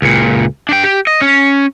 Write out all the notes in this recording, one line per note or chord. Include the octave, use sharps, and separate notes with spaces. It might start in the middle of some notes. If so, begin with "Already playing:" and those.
C#2 A#2
D4 G5
G4
D#5
C#4